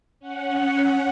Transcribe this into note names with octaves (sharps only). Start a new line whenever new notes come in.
C#4 F#5